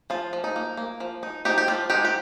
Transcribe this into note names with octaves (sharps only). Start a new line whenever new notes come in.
F3 F4
F3
D#4
A#3
A#3
F3
D#4
F3 D#4 G4
G4
F3 F4
G#3 D#4 G4
G4